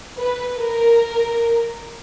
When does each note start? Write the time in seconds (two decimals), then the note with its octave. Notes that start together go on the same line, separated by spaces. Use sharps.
0.19 B4
0.60 A#4